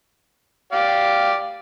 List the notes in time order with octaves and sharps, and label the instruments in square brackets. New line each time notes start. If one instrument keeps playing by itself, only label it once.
[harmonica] G4 D5 F5